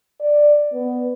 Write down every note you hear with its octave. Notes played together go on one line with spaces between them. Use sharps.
D5
B3